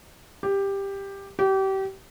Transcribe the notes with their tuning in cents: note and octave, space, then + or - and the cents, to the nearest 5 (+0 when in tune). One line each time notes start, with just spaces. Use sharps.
G4 +10
G4 -30